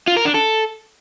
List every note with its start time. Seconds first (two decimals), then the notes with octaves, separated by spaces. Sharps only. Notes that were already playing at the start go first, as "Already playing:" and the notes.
0.08 F4
0.16 A#4
0.25 D4
0.34 A4